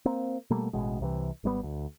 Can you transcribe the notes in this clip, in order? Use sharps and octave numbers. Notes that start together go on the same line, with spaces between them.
A#3 C4
B2 G3 A3 A#3
A1 B2 G#3
C2 C3 E3
G#1 G3 B3
D2